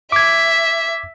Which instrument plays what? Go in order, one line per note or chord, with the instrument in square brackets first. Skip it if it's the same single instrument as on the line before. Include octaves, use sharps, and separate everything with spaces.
[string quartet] E5 [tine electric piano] D6 G#6